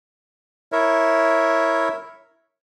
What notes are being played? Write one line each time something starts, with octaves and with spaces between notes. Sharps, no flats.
E4 A#4 C#5 E5